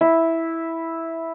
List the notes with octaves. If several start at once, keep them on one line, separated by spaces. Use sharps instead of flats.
E4